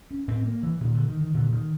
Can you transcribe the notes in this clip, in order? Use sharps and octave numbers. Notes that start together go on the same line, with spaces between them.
C#4
A2 C4
A#3
E3
A#2 D#3
D3
D#3
D#3
A#2 D3
D#3